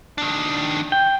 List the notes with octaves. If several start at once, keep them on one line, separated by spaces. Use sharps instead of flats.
D#3 D4
G5